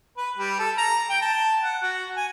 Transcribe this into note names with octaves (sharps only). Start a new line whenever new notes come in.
B4
G3
A4
A#5
G5
A5
F#5
F#4
G#5